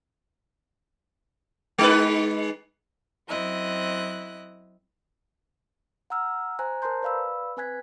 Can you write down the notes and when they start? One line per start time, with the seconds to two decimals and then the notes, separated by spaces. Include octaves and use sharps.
1.78 G#3 D#4 B4
3.28 F#2 C4 E4 D#5 F#6
6.10 F#5 A#5 E6 F6
6.59 C5 G#5 A#5 F#6
6.82 A#4 C5 A5 A#5 C6 G6
7.03 B4 D5 F5 B5 E6
7.57 C4 B4 G#5 F#6 G#6 B6